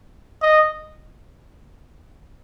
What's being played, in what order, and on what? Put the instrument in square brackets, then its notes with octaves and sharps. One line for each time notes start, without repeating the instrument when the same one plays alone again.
[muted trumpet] D#5